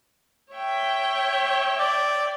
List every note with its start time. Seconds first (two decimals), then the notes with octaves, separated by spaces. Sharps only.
0.53 C#5 E5 G5
1.79 D5